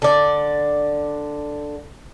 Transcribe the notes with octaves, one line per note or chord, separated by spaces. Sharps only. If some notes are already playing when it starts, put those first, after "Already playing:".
D3 D5